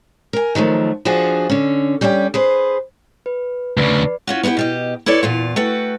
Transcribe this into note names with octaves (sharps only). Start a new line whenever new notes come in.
A#4 G#5
D#3 F3 F#3 A3
F3 D4 F4 F#4 G#4
D3 C#4
G3 C#4 D5 F5 G5
G#4 B4 C5
B4
D2 C#3 B4 D5
C#4 F4 F#4
B3 D#4 E4 G4 B4
B2 G4 D#5
E4 A4 B4 C#5 D5
E2 A#2 F4
A3 F#4 B4 G5